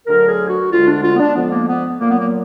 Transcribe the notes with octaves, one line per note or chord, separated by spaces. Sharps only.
D2 D3 F#3 A#4
G#4
F#4
D2 D3 G#3 F4
D4
F4
B3
D4
F2 F3 G#3 B3
A#3
B3
A#2 F#3 A#3
B3
A#3